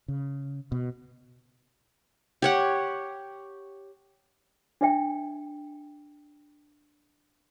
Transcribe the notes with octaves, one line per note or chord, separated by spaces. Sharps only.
C#3
B2
G4 C#5 F#5
D4 D5 E5 G5